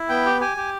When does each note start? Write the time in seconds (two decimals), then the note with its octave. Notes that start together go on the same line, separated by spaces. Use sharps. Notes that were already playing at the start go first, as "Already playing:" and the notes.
Already playing: E4
0.09 B3 G5
0.26 G4
0.40 G4 G#5
0.57 G4